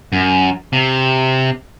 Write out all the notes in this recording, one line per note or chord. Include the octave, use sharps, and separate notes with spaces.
F#2
C3